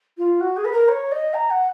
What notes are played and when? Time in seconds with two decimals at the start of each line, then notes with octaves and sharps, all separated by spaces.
0.18 F4
0.40 F#4
0.57 G#4
0.65 B4
0.72 A#4
0.88 C#5
1.12 D#5
1.34 A#5
1.50 F#5